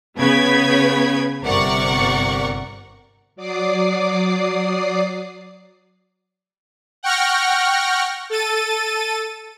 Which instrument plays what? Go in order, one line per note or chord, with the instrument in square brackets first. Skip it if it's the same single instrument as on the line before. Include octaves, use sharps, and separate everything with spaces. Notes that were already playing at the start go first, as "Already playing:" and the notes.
[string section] C#3 B3 B4 G#6 B6
G1 C3 A#4 D5 F#5 C#6
[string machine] F#3 D5 D6 D#6 C7
[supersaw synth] F#5 G5 C#6 F6 A#6
A4 A6 D#7